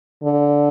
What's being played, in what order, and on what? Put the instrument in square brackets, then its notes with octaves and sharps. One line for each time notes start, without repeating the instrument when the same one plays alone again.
[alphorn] D3